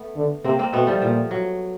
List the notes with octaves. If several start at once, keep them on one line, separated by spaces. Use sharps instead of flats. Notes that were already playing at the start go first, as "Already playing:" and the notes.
Already playing: A3 B3
D3
C3 A#3 C4
A#3 C4
B2 A3 B3
F3 G3
A#2 F3
F#3